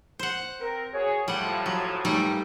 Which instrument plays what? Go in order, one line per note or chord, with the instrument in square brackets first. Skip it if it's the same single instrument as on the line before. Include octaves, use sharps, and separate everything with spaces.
[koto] C5 F#5
[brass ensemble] C4 A#4
F#4 G#4 C#5
[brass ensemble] A2 F3 [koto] G3 F#5
[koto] F#3
[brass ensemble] G2 A#2 [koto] G3 A3 D#4